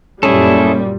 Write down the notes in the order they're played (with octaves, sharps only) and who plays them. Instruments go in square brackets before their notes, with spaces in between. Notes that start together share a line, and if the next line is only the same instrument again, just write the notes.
[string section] F#2 A#2 G3 [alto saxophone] C#4 [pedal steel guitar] E4 G#4 A4